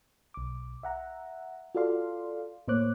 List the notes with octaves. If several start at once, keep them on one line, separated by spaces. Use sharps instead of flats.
B1 D6
E5 F#5 A#5
F4 F#4 A4 D5 F5 C6
A2 A#3 C5 C#5 D6 F#6